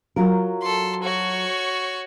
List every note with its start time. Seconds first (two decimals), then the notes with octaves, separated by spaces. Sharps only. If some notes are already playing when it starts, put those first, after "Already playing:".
0.16 F#3 F4 A#4
0.62 A4 C6
1.03 F#4 C#5